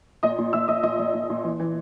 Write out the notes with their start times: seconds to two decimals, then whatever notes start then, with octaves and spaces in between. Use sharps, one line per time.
0.23 A#2 D#5 D#6
0.38 A#2
0.53 A#2 E5 E6
0.68 A#2 D#5 D#6
0.83 A#2 D#5 D#6
0.99 A#2
1.14 A#2
1.30 A#2
1.44 E3
1.60 E3